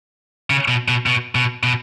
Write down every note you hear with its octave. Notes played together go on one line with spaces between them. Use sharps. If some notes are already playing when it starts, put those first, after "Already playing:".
C#3
B2
B2
B2
B2
B2